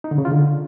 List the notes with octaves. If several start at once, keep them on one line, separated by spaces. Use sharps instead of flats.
D#4
D3
C#3
F4
D3